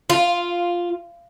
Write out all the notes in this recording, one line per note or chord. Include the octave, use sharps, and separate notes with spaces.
F4